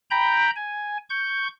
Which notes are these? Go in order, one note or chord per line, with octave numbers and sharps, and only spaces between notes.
G5 A#5 B5 G6
G#5
C#6 G6